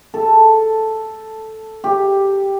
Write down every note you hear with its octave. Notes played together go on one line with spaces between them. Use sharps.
A4
G4